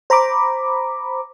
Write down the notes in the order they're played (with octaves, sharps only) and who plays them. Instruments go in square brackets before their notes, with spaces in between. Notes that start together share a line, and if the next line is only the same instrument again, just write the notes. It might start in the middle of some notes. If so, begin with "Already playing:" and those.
[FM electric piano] C5 A#5 B5 D6